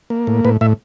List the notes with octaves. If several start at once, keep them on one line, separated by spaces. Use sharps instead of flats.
A#3
A2
A2 B4
A2 E5